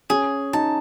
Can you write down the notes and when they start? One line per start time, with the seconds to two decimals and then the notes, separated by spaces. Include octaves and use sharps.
0.10 C#4 G#4
0.53 D#4 A5